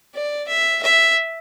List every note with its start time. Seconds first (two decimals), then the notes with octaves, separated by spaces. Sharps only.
0.15 D5
0.48 E5
0.83 E5